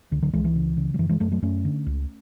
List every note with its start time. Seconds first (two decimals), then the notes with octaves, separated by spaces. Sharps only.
0.11 C#2 D3
0.22 D3 F#3
0.33 C#2 E3 G#3
0.44 E3
0.56 C#3
0.77 C#3
0.94 F#3
0.99 F#2 E3
1.09 E3 G#3
1.20 F#2 F#3 A3
1.32 F#3 A3
1.42 F#2 A3 C#4
1.65 D3
1.86 C#2